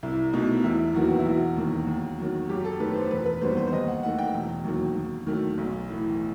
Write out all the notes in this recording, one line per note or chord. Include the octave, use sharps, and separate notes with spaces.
C2 E4
B2 A3 D#4
E1 E4
D#2 D#3 F#3 B3 F#4
E4
E1 F#4
D#2 D#3
D#2
D#3 F#3
F#2 G4
A4
D#3 A3 B4
C5
E1 B4
B4
D#2 D#3 G3 B3 C5
C5
C5
D#2 D#5
F#5
D#3 A3 F#5
G5
E1
D#2 D#3 F#3
D#2
D#3 F#3 A3
B1
A2 E3